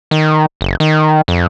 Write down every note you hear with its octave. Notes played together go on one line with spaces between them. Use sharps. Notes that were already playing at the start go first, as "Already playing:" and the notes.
D#3
F#1
D#3
F2